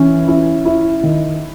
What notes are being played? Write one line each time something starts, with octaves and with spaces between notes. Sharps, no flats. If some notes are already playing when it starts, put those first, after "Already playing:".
Already playing: E3 C#4
E4
E4
D#3